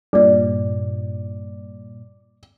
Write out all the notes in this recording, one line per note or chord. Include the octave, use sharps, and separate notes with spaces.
G2 A#2 D5